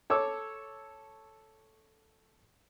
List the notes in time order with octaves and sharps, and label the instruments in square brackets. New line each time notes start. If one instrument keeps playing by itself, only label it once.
[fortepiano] A4 C#5 D6 E6